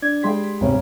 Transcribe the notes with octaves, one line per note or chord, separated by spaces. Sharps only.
D4 D5 G#6
G3 G#3 G#4 G5 C6 B6
D2 G#2 C3 A#3 C#4